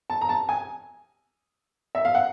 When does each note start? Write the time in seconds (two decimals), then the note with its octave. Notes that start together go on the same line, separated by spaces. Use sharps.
0.10 A5
0.21 A#5
0.29 A5
0.49 G#5
1.95 E5
2.05 F5
2.15 F#5